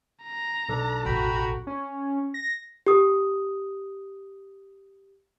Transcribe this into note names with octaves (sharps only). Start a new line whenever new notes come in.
A#5
B1 D4 A4
A1 E2 F#4 G5 A#5 B5
C#4
A#6
G4 D#6